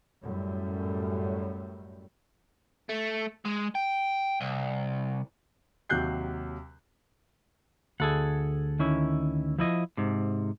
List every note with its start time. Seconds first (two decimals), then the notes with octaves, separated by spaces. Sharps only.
0.23 F#2 A2 G3
2.89 A3
3.45 G#3
3.75 G5
4.41 C2
5.90 D#2 C3 F#3 F#6 G6 C7
8.00 D2 G#4 A4 F#5
8.79 D#3 C#4 E4
9.59 F3 E4 D#5
9.97 G#2 C3